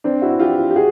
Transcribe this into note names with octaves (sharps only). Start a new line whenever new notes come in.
C4 D4
E4 F#4
F4 G4
G4
F#4 G#4